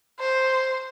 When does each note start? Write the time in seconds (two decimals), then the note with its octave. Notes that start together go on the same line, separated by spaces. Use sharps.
0.20 C5